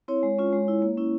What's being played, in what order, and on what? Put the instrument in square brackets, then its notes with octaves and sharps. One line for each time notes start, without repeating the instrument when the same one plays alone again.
[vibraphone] C4 E4 C#5
G#3
C#4 F4
G#3
E4
A#3
C#4 E4